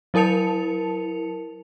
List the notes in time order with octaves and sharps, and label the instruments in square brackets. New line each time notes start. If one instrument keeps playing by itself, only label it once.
[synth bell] F#3 E4 A#4 A5 C#7 F7